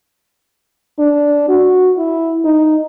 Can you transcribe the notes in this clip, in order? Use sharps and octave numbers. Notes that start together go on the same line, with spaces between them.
D4
F#4
E4
D#4